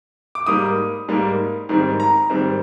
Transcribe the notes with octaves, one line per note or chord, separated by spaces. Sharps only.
D6
G#2 G3 A#3 D#6
G#2 G3 A#3
G#2 D#3 G3 C4
A#5
G#2 D#3 G3 C4